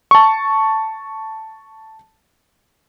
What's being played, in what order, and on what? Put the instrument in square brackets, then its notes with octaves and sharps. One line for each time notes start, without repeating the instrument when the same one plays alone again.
[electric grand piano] A5 C#6